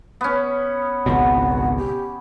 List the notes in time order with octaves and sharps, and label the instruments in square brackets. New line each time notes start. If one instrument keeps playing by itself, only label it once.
[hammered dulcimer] B3 C#4
[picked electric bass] G#1 C#2 B2 [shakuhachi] F#5
[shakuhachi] G4